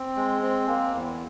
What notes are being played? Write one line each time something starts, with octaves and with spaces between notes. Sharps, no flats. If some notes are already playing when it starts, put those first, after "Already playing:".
Already playing: C4
G#3
C4
A#3
E2